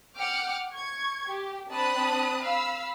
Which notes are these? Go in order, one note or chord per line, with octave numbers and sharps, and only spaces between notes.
F#5 G5 D6 F6
C#6 G#6
G4
C4 D4 A5 B5 D#6 F#6
F5 B5 E6